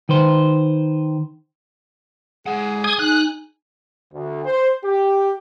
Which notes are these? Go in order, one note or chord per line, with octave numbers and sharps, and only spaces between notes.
D#3 B4 C5
G#3 G#4 F#5
D#6 G#6
D#4 G#5 F#6
D2
C5
G4